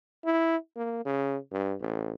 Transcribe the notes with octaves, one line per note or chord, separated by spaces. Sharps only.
E4
A#3
C#3
G2
A1